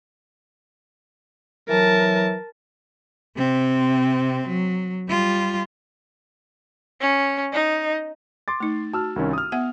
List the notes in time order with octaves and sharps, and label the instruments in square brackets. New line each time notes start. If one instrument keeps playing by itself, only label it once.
[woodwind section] E3 F#3 [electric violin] A#4 A5
[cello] C3 C4
F#3
G3 F4
[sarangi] C#4
D#4
[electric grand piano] C6 D6 A6
[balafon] A3 D#4
[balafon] F#4 [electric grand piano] A5 E6 F6
[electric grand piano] C2 D#3 C#4
D#6 F6
[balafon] B3 E5 F#5